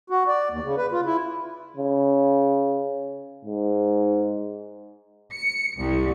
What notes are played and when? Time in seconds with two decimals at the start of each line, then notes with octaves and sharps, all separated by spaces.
0.10 F#4
0.27 D5
0.51 D#2
0.64 C#3
0.77 B4
0.92 F4
1.06 E4
1.77 C#3
3.45 G#2
5.31 C#7
5.78 C2